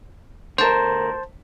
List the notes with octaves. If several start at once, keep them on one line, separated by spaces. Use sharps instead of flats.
D2 A#4 C5 A5